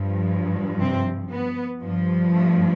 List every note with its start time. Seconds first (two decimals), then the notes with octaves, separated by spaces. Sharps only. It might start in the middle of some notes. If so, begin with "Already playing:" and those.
Already playing: G2 F3
0.80 C3 C4
1.31 B3
1.82 G2 F3
2.34 A3